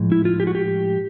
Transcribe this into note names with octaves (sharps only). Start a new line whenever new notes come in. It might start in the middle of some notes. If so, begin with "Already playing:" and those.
Already playing: A2 F3 G#3
E4
F4
G4
F#4
G4